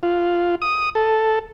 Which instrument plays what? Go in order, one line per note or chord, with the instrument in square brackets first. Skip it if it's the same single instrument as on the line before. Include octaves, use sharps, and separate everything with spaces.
[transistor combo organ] F4
D#6
A4